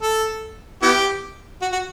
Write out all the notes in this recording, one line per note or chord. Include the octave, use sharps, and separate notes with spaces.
A4
B3 E4 G4
F#4
F#4